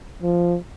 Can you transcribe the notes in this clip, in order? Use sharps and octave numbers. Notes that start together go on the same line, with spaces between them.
F3